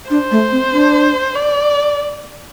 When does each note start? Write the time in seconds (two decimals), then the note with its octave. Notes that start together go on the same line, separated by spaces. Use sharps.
0.10 D4 C5
0.31 A3
0.52 C4
0.72 D4
1.35 D5